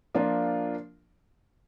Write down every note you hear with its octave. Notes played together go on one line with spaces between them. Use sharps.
F3 A#3 D4 F4